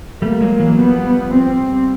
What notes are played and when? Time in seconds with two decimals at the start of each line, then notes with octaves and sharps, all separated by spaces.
0.22 G3 A3 A#3
0.41 F#3 G#3
0.60 E3 F#3
0.78 F3 G3 B3
1.34 C4